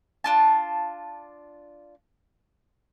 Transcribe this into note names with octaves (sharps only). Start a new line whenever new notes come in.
D4 F4 A5